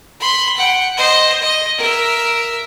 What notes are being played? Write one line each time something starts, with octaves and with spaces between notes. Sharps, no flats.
B5 C6
F#5 G5
C5 D#5
D#5
A#4 E5